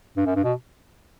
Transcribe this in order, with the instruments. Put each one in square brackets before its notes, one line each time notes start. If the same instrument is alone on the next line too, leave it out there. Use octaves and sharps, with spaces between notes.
[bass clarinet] G2
F#2
G2
B2